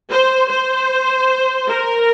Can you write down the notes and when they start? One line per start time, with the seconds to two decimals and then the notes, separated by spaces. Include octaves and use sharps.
0.10 C5
0.49 C5
1.68 A#4